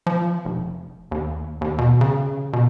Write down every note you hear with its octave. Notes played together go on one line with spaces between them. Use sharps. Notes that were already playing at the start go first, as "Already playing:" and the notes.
F3
F1
D#2
D#2
B2
C#3
B2